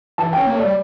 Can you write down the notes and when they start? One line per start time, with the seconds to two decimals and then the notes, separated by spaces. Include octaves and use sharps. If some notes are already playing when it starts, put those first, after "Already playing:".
0.18 E3 A5
0.33 C#4 G5
0.46 A#3 C#5
0.55 A3 D5
0.64 G3